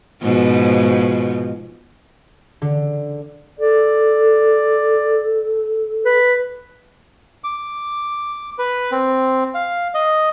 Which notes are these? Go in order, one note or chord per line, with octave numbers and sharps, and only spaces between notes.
G#2 B2 F3
D3
A4 D5
B4
D6
B4
C4
F5
D#5